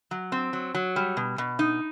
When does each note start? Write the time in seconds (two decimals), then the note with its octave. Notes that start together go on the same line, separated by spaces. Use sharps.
0.11 F#3
0.32 C4
0.53 F#3
0.74 F#3
0.96 G3
1.17 B2
1.38 B2
1.59 D#4